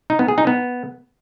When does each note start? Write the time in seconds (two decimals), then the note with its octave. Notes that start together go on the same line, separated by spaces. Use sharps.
0.10 D#4
0.19 B3
0.28 G#4
0.38 D#4
0.47 B3